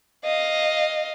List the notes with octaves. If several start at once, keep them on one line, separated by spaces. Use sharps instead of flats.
D#5 F5